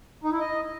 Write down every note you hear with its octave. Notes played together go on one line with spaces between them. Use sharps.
D#4
E4
D#5